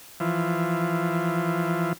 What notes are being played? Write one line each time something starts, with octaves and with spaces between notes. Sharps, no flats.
E3 F3